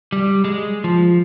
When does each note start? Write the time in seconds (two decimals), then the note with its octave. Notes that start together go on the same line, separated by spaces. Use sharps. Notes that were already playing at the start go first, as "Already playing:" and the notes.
0.12 G3
0.44 G#3
0.84 F3